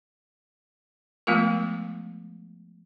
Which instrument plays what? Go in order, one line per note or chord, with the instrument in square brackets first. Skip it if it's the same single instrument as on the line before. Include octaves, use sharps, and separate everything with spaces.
[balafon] F3 G#3 A3 B3 F4 A#4